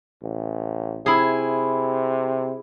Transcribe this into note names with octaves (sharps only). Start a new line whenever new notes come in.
A1
C3 E4 G#4